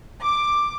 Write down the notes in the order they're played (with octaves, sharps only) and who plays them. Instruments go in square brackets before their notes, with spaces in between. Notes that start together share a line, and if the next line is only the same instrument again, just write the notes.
[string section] D6